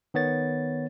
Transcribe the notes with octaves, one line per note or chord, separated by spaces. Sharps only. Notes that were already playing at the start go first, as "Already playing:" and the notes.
D#3 B3 C#5 A6